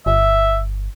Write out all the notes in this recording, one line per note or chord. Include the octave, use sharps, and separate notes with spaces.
G1 E5